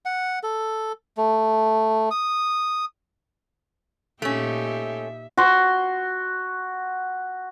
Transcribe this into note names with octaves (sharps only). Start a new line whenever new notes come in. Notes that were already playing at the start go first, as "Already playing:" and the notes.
F#5
A4
A3
D#6
A#2 A3 C#4 D#4 G4 E5
F#4 C6